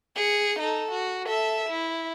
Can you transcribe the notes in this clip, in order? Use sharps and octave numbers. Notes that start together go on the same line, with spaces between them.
G#4 C#7
D#4 A4
F#4
A4 E5
E4